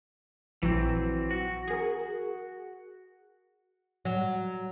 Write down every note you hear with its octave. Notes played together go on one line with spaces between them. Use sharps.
A#1 E3 F#3 C4
F#4
G#4 A#4
F#3